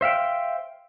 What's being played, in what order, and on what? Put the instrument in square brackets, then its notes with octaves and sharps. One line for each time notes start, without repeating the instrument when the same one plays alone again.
[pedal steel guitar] C5 E5 F5 G5